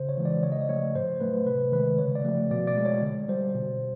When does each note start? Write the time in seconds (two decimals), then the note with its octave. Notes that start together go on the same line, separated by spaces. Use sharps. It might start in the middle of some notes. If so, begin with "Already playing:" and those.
Already playing: C#3 C5
0.09 C#5
0.18 E3 G#3
0.25 D5
0.43 C#3 C#5
0.52 D#5
0.61 D5
0.69 F3 A3 C#5
0.95 A2 C5
1.20 F#3 A3 B4
1.46 C3 B4
1.72 D#3 G#3 B4
1.98 C#3 C#5
2.15 D5
2.24 F3 A3
2.51 B2 D5
2.67 D5
2.77 G#3
2.85 C#5
3.02 D3
3.28 G3 C5
3.55 B2